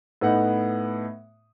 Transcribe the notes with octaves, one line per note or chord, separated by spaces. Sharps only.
A2 B3 D#4 F#5